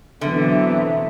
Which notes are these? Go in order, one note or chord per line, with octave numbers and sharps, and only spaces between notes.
B2 D3 E3 F#3 B3 C4 E5